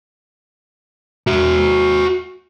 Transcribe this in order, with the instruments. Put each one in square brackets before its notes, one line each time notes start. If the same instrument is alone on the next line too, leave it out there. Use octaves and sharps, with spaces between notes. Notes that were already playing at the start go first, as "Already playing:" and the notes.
[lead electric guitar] F#4 E5